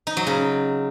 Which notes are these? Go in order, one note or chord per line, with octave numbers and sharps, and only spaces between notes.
D#4
F#3
C#3